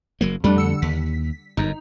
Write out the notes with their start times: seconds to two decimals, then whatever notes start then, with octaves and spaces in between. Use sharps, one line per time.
0.21 F#1 F#3 A#3
0.44 F2 G3 A3 D4
0.56 D3 E6 C#7
0.82 D#2 B6
1.57 G1 F#2 D#4